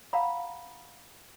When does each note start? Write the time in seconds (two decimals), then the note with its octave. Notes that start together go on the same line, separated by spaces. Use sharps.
0.13 F5 F#5 A#5 B5